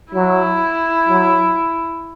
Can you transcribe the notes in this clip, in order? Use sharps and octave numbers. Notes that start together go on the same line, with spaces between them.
F#3 E4
F#3